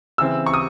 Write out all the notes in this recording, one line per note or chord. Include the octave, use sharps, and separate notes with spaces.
C#3 E3 C4 E6
C#6
D#6